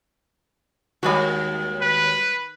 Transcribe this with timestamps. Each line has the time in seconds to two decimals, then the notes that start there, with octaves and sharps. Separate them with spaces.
1.03 D#2 G3 G#3 F#4
1.82 B4